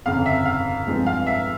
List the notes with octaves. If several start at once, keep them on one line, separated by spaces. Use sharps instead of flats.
G1 F2 C#3 F5
E5
F5
G2 F3 G#3 C4
F5
E5